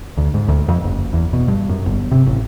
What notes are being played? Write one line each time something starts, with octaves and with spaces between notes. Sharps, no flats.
D2
G#2
D2
F2
F#1
E2
B2
G2
F#2
G1
C3
A1